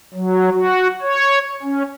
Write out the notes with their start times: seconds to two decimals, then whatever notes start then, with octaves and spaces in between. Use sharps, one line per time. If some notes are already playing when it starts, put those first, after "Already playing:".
0.14 F#3
0.52 F#4
1.01 C#5
1.62 C#4